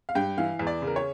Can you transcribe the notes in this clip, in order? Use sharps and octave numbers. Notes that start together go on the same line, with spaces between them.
F5
G2 G5
E3 F5
E2
D5
C#3
A#4
C#5